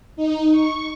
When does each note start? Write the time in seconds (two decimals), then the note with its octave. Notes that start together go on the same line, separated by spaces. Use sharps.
0.16 D#4
0.52 C#6